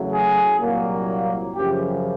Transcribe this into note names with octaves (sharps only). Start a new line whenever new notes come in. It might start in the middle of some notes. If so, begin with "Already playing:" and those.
Already playing: E2 C#3 F#3 A3
G#4
C2 A#2 F#3 A#3
F#2 C#3 F3 G4